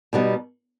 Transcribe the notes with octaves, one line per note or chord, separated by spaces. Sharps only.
B2 G3 B3 D#4